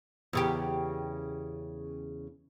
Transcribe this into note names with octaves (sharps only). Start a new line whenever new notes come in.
E2 C#3 G4